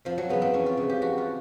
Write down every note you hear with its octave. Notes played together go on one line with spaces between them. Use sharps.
F2 F3
F#3
C#3 E3 B3
C4
F2 C#4
F4
C#3 E3
G4
F2 F#4
F4